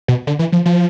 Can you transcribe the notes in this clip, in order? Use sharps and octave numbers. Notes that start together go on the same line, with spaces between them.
B2
D3
E3
F3
F3